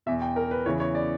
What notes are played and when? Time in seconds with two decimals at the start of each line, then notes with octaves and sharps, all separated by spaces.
0.06 E2 B2 E5
0.22 G5
0.36 A#4
0.51 B4
0.66 E2 C#3 E3 C#5
0.80 C#5
0.95 D5